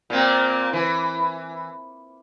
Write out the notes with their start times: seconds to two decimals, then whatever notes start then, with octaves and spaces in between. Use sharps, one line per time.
0.10 A#2 A#3 C4
0.73 E3